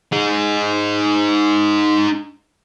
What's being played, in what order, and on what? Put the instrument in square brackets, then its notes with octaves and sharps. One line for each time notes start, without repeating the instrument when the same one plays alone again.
[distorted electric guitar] D#4 G#4